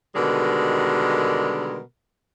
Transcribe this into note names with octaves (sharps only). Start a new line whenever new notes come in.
B2 D3 D#3 G3 G#3 A#4